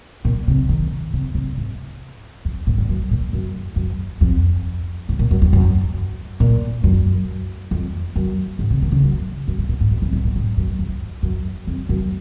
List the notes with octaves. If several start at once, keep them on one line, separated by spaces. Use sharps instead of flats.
A#2
C3
D#3
C3
C3
G#2
F2
A#2
G#2
F#2
A#2
F#2
F#2
F2
G#2
A#2
F#2
F2
F#2
A#2
F#2
F2
F#2
G#2
C3
D#3
C#3
F#2
F#2
G#2
A#2
G#2
F#2
F2
G#2
A#2
G#2
F#2
F2
F#2
F2
F#2